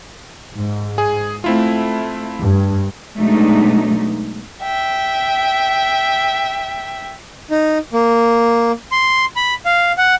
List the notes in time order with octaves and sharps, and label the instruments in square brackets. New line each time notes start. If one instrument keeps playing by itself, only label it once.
[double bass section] G#2
[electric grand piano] G#4 G#5
[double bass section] A3 [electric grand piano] C4 E4 F4
[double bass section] G2
[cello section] B2 F#3 G#3 A3 D4 D#4
[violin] E5 G5
[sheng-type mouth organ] D#4
A#3
C6
B5
F5
F#5